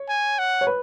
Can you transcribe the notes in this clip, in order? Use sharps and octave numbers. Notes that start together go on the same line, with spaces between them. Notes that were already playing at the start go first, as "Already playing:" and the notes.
Already playing: C#5
G#5
F#5
C#5
B4